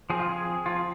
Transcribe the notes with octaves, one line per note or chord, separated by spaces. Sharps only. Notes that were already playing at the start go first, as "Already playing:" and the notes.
F3 C4 G#4
F4
G#4
F3 C4 F4